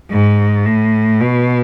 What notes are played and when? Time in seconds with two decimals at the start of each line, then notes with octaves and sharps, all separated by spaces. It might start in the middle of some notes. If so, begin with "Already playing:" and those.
0.11 G#2
0.66 A2
1.21 B2